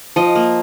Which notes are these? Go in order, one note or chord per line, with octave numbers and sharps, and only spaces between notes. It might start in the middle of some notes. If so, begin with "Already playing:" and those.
F3 D#5
A#3